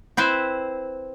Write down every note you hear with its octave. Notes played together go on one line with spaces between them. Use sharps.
C4 E4 B4 C5